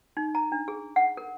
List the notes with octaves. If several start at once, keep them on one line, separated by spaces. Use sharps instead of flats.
D#4
A#5
D4
G#4
F#5
A#4